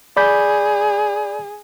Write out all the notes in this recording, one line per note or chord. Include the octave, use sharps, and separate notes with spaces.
G#4 D5 B5 G6